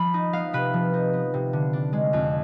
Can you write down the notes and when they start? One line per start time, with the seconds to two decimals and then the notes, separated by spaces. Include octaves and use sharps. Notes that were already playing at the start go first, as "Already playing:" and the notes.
Already playing: F3 B5
0.14 D#4
0.33 B3 F5
0.53 C3 B4
0.74 F3
0.94 D#4
1.14 B3
1.34 C3
1.53 D3
1.73 D4
1.93 G#3
2.13 F2